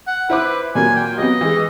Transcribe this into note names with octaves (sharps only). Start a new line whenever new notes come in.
F#5
E4 B4 C5 D6
A#2 F#3 A#3 G#5
G5
F#3 B3 D#5
E3 G#3